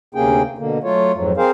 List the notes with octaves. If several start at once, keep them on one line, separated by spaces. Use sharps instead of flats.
D2 C3 A#3 C#4 G#4 G5
B2 D3 A#3
F#3 A3 F4 C#5
F2 G#2 F#3
C4 G#4 A#4 C5 F5